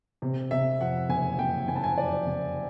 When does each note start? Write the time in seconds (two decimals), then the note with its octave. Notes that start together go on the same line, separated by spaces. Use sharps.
0.22 C3
0.51 C3 E5
0.80 F2 F#5
1.09 F#1 G#5
1.39 F#1 G5
1.68 F#1 G#5
1.76 A5
1.84 G#5
1.97 F2 D5
2.27 F#1